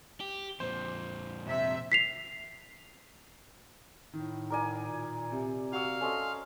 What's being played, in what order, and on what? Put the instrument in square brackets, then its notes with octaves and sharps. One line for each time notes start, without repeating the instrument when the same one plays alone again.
[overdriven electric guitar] G4
[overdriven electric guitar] F2 A#2 [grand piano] C5
[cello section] C3 E5
[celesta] B6 C7 F7
[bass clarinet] A2 [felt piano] D#3
[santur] A#4 D5 G#5
[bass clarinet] A#2
[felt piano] C3
[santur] F#4 E6 [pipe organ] F5
[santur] C#4 C5 D#5 [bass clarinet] A4